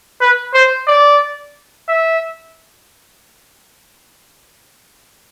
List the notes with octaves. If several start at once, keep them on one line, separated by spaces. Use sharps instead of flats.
B4
C5
D5
E5